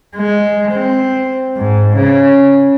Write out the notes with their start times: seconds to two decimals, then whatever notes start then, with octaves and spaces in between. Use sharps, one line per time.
0.17 G#3
0.72 C4
1.57 G#2
1.96 C#3